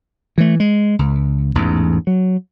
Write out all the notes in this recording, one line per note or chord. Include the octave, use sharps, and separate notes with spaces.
E3 A3
G#3
C#2
A1 E2 G#2
F#3